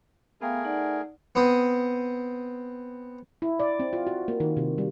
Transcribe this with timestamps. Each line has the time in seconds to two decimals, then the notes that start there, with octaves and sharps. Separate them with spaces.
0.41 A3 B3 G#4 A#4 F5 G5
0.65 D#4 D5 F#5
1.35 B3 C4 D#6
3.42 E4
3.60 D5
3.80 C4
3.93 F4
4.07 F#4
4.28 A#3
4.40 D#3
4.57 C3
4.78 G3